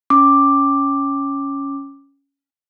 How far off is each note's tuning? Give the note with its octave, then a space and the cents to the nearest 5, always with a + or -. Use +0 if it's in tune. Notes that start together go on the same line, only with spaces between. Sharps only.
C#4 +5 D6 +5